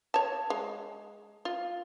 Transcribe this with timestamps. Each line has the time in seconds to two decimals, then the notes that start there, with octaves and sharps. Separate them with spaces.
0.14 C#5 A5
0.50 G#3
1.45 F4